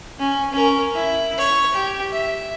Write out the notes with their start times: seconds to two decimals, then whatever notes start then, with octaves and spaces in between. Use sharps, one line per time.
0.19 C#4
0.52 C#4 A#4
0.94 E4
1.38 C#5
1.72 G4
2.11 E5